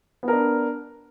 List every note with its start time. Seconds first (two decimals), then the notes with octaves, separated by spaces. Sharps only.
0.23 B3
0.28 A#4
0.33 D4